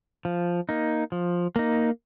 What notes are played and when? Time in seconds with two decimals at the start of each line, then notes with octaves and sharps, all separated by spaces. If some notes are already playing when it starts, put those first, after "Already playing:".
0.25 F3
0.69 A#3 D#4
1.12 F3
1.56 A#3 D#4